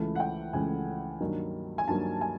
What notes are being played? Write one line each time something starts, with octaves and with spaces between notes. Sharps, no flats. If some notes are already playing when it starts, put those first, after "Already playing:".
Already playing: C#2 C#3 E3 A3
F#5
G5
C#2 C#3 E3 A3 G#5
G2 D#3 F#3 A#3
G#5
G2 D#3 F#3 A#3 A5
G#5